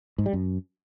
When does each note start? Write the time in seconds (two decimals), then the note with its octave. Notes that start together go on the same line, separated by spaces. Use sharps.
0.18 G#2
0.26 G3
0.33 F#2